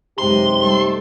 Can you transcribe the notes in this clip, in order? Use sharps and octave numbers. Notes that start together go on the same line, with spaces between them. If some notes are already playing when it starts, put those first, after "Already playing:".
F#2 C3 E3 G#3 D#4 G4 C6
G3 A3 A4